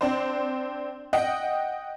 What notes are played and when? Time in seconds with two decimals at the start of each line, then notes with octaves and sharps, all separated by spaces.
0.01 C4 D4 C5
1.13 D#5 F#5 G5